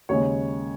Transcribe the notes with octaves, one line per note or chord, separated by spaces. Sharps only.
D#2 C#3 G#3 C#5